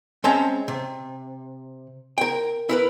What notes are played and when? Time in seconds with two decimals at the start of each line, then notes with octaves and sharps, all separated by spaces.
0.24 G#3 C4 C#4 E5 A5 A#5
0.68 C3
2.18 A#4 G5
2.69 E4 A#4 B4